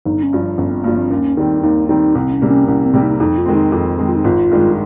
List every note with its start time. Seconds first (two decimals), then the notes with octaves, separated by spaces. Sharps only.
0.05 G1 D#4
0.23 C#4
0.33 G2 F3
0.58 G1 C#4
0.71 C4
0.84 G2 F3 A#3
0.98 C4
1.10 D#2 C#4
1.37 D#3 G3 C4 D#4
1.63 D#2 D#4
1.89 D#3 G3 C4 D#4
2.15 C2 C4
2.32 C#4
2.42 C3 G3 A#3
2.50 C#4
2.68 C2 C#4
2.86 C4
2.94 C3 G3 A#3
3.02 D#4
3.20 F2 D#4
3.38 F4
3.46 D#3 G#3 C4
3.55 D#4
3.72 F2 F4
3.98 D#3 G#3 C4
4.08 F4
4.16 D#4
4.24 G#1 F4
4.51 G2 D#3 G#3